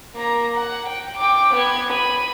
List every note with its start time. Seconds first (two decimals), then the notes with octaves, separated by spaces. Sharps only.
0.16 A#3 A#5
0.57 F#5
0.88 G5
1.18 G5 D6
1.55 B3 G#6
1.91 B5 D#7